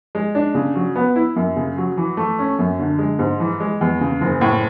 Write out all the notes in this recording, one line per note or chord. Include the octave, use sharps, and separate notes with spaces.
G#3
D4
C#3
F#3
B3
E4
F#2
C#3
F#3
E3
A3
C#4
F#2
D3
G#3
G#2
E3
G#3
E2
C#3
F#1
A2